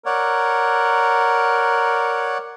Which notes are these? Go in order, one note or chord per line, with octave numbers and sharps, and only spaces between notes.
A#4 C#5 D5 F#5